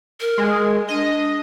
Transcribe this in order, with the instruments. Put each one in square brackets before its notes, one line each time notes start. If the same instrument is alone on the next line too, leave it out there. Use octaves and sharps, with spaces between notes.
[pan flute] A#4
[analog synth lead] G#3
[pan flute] D4 [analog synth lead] D#5